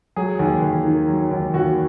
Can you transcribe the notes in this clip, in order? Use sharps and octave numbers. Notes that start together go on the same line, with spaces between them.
F#3 G#4
D#2
D#2
D#3
F#3
D#2
D#2 F#4